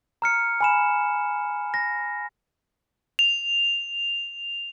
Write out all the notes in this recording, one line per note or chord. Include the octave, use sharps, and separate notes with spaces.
A#5 F6 C#7
G#5 B5 E7
A#6
F7